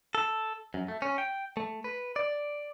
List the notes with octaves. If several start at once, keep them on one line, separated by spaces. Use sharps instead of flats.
A4
F#2
A3
C#4
G5
A3
B4
D5